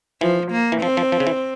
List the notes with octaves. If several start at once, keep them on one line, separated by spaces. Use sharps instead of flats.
E3 F3
A#3
E3
F3 C4
F3
F3
C#3
E3